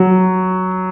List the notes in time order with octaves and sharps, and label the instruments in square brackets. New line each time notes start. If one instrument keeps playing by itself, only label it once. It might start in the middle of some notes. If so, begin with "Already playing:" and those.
Already playing: [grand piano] F#3